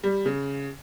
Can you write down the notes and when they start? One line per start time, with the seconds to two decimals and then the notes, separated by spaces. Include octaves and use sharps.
0.04 G3
0.26 C#3